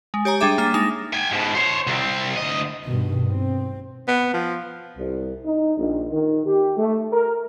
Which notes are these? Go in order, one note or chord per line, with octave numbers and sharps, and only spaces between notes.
G#3
G4 C#5 G#5 A#5
G3 D4 G#4 E5 D6
A#3 D4 F6
G#3 D#4 A#6 E7
G5 G#5
G#2 B2
C5 C#5
C2 C4
D2 D#5
G2 B2 D#3
C4
B3
F3
C2
D#4
A#1
D#3
G4
A3
A#4